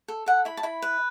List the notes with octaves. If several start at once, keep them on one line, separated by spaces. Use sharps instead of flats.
A4
A4 F#5
E4 B5
A5
E4 B5
B4